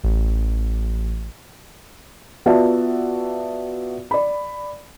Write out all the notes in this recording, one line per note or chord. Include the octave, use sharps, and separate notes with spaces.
A1
B3 F4 F#4 D5 E5 A5
D5 B5